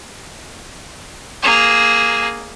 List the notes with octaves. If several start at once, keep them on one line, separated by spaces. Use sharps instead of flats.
A#3 G#4